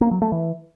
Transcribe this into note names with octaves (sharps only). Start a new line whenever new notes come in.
A#3
F#3
A3
E3